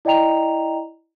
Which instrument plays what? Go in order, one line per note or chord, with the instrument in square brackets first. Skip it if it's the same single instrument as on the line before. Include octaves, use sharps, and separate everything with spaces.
[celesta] E4 D5 D#5 G5 A#5 F7